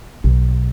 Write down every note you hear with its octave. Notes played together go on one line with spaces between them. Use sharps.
B1